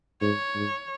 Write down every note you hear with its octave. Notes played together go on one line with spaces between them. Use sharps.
G#2 C#5
G#2